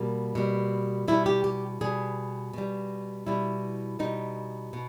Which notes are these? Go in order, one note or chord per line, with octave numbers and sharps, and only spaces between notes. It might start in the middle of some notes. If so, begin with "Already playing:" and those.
Already playing: B2 G3 A#3
B2 G3
B2 G3 E4
G4
G4
B2 G3 G#4
B2 G3
B2 G3 E4
B2 G3 D#4
B2